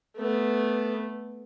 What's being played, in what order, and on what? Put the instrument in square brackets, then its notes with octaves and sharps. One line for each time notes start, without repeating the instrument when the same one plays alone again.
[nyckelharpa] A3 B3